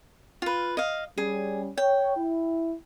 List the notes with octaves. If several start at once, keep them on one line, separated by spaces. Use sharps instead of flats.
F4 B4
D#5 F5
G3 C#4 G#4
C#5 G5
E4